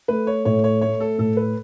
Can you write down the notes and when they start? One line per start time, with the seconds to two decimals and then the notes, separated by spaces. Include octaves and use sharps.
0.08 A3 B4
0.27 C#5
0.45 A2 C#5
0.64 C#5
0.81 A3 C#5
1.00 A4
1.18 A2 A4
1.37 B4